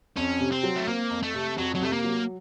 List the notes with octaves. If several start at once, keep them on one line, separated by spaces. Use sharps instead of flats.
F2 C#4
C3
C4
F#3
A3
A#3 C4
F2
A3
C3
F2 F#3
F#3
C3 A3
A#3
F#3